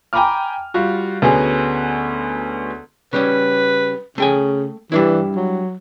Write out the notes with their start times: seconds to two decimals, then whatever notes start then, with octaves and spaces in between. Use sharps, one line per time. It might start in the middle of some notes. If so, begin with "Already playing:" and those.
0.13 G5 G#5 A#5 B5 D6 F6
0.74 G3 F4 F#4
1.22 D2 B3 C#4 F#4 G#4 G#5
3.13 C#3 G3 C#4 B4
4.18 C#3 A3 G5 G#5
4.92 E3 G3 D4 E4
5.36 F#3